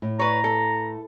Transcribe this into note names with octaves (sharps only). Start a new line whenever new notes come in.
A2
B4 C#5 A#5
A4